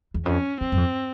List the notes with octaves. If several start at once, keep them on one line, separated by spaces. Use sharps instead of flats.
E2
F2 C#4
E2 C4
F#2
F2